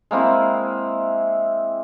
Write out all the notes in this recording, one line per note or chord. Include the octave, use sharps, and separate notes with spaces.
G#3 A#3 C4 E4